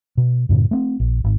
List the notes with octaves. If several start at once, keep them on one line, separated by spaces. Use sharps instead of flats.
B2
F#2 A2 C#3
A3 C4
A#1
G#1